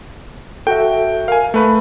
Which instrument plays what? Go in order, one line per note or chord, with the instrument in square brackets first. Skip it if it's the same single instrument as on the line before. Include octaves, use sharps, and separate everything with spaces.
[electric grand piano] F#4 G5 [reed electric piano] A4 E5
[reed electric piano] A#4 [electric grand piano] F5 G#5
[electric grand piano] A3 B4 B5